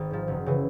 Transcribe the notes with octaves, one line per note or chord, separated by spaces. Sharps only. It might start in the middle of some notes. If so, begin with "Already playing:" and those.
Already playing: G#1
G#2 F3
F#1
C#3 E3